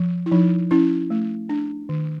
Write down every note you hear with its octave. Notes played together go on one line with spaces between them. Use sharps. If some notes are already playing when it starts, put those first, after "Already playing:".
Already playing: F3
E4
F3 D#4
C#4 E4
A3
D4
D#3